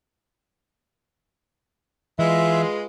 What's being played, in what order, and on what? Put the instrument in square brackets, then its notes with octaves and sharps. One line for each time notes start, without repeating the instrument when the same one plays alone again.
[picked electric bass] E3 [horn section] G#3 [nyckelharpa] F4 B4 [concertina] E5